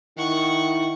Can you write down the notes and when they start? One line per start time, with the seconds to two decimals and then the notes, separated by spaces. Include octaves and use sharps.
0.18 D#3 E4 F#5 C#6